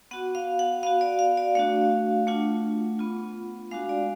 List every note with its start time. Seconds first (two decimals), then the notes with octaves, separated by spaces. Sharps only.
0.11 B3 F#4 F#5
0.35 F5
0.59 F#5
0.83 B3 F#4 F5
1.01 D5
1.19 F5
1.37 D5
1.55 A3 D4 F#4 F5
2.27 A3 D4 F4 F#5
2.99 B3 F4
3.71 G#3 D4 F#4 F5
3.89 D5